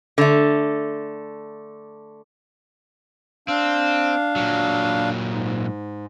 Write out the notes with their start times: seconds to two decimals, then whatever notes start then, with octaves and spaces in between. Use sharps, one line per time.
0.18 D3 A3
3.48 C4 D4 F5
4.36 A#2 F#3
5.28 G#2